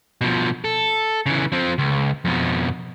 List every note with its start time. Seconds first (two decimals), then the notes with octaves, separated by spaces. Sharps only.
0.21 B2 F3
0.64 A4
1.26 C#3 E3
1.52 F3 C4
1.78 C#2
2.25 F2 B2